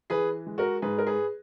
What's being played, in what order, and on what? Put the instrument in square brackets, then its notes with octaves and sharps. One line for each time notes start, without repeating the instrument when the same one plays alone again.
[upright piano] E3 G#4 B4
G#3
F#4 A#4
G#2 G#4 B4
A#4
G#4 B4